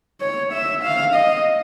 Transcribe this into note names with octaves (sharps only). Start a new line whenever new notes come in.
C#5
E5
F5
D#5